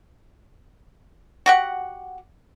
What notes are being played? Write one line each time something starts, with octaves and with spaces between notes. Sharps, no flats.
F#4 G4 F#5